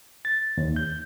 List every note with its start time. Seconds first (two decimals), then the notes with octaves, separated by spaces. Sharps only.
0.25 A6
0.57 D#2
0.76 G6